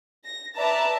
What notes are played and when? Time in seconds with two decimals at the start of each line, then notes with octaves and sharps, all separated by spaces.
0.24 A#6
0.55 B4 D5 E5 A5 A#5